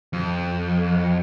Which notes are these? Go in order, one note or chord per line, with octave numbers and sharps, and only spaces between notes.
F2